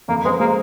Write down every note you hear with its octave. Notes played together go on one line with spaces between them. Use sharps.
F2 A#3
G#3 C4
G#3 A#3